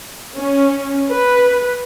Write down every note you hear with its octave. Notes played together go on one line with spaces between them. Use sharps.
C#4
B4